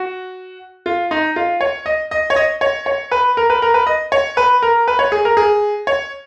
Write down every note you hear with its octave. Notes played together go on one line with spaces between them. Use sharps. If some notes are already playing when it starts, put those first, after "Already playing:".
Already playing: F#4
F4
D#4
F4
C#5
D#5
D#5
C#5
D#5
C#5
C#5
B4
A#4
B4
A#4
B4
D#5
C#5
B4
A#4
B4
C#5
G#4
A#4
G#4
C#5